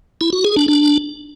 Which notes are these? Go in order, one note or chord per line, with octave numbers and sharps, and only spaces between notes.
E4
F#4
G#4
D4
D4